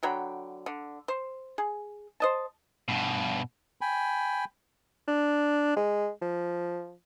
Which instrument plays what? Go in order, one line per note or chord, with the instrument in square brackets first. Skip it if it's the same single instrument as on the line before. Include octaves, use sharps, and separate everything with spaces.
[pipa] D3 F#3 G5 B5
D3
C5
G#4
C5 D#5 A5
[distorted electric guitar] G2 B2
[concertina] G5 G#5 B5
[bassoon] D4
G#3
F3